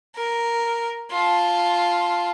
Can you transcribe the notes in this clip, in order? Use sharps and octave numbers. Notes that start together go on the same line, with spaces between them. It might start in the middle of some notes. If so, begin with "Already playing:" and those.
A#4
F4 A5